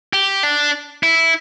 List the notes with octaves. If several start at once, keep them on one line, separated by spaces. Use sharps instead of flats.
G4
D4
E4